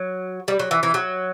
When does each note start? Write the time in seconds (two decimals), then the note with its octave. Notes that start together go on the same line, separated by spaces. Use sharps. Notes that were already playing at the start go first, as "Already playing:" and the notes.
Already playing: F#3
0.48 G3
0.59 F#3
0.71 E3
0.83 E3
0.94 F#3